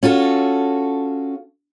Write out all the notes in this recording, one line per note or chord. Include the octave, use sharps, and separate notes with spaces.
C#4 F4 F#4 A4